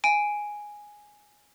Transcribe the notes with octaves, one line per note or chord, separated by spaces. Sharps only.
G#5 D7